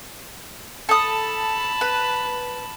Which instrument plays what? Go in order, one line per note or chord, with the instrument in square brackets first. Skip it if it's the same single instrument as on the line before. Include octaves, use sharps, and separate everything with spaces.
[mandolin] A4 D#6 [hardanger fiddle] A5 B5
[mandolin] B4